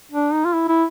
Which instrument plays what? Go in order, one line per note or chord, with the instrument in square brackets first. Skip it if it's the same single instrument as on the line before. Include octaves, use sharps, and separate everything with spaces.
[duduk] D4
D#4
F4
E4
E4